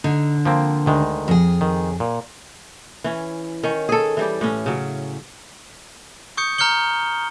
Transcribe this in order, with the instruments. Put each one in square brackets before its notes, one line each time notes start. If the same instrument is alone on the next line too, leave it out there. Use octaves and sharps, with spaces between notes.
[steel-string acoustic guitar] D3 [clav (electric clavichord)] D#4
[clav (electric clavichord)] F3 A#3 C4
D2 D#3 G#3
[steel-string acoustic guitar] F2 G#4
[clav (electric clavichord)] D#3
A#2
[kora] E3 C#4
D#3 C#4
G#4 A4
E3 G3 G4
A2 C#4
C#3 F#3
[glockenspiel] C#6 D#6 G6 C#7
A#5 F6 G6 C#7 G7